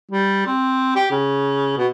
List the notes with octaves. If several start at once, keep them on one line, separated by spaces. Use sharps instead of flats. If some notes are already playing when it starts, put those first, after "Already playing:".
G3
C4
G4
C#3
B2